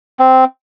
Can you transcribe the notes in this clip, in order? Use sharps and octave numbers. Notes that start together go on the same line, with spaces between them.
C4